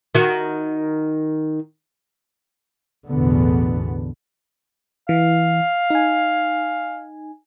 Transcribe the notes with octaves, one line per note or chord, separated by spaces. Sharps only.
D#3 F#4
A1 E2 B2 D3 B3
E3 F5
D#4 G#5